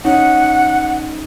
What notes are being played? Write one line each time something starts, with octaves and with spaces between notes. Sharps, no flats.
C#4 D#4 F#5